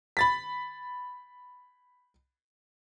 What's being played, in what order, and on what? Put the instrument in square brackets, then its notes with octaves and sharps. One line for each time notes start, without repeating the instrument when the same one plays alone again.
[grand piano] B5 A6 B6